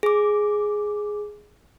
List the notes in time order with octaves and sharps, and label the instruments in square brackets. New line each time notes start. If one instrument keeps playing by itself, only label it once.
[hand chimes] G#4 D6